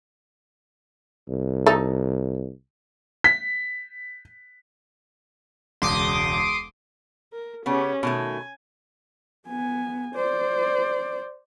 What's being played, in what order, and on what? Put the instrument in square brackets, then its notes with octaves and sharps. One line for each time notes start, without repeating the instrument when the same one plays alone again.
[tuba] C2
[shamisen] D#4 A4
[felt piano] B6
[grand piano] E1 C#2 [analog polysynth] C6 D6 D#6
[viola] A#4
[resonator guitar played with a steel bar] C#3 B3 [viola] C#4 G4
[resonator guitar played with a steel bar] B2 D#3 A3 [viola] G#5
[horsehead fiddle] B3 G#5
C5 D5